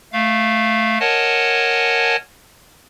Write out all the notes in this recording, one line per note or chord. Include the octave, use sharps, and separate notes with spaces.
A3 F5
A#4 C#5 D#5 F#5 G#5 A5